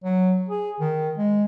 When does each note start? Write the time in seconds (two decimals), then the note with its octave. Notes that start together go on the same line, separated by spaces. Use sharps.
0.04 F#3
0.49 G#4
0.80 D#3
1.18 G#3